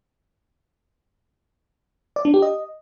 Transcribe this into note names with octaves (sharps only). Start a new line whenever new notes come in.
D5
D4
G4
D#5